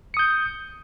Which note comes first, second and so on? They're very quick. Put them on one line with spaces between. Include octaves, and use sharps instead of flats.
C#7 D#6 G6